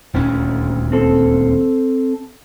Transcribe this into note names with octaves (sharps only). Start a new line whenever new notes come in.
D#1 D2 C#4
C4 A4